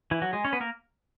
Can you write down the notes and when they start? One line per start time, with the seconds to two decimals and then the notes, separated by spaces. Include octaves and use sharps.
0.11 E3 E4
0.22 F#3 F#4
0.33 G#3 G#4
0.44 C#4 C#5
0.53 B3 B4
0.60 A#3 A#4